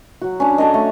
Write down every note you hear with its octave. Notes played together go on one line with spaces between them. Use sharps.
F#3 F#4
C#4 D4
A4 C#5 D#5
A3